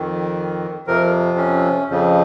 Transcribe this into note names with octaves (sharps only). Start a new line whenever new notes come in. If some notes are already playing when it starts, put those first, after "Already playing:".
Already playing: F2 D#3
F2 C3 F3 A#4
C#4
F2 C#3 F3